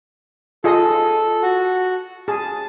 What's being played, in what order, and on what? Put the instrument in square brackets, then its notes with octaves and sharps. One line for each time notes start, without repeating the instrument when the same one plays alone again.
[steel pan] F4 G#4 D#5 [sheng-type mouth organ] A4
[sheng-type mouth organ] F#4
[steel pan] G#4 [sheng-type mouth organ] A5